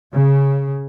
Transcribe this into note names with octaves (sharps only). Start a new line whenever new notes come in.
C#3